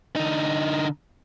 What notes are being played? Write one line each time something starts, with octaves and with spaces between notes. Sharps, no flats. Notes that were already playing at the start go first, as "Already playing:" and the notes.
D3 D#4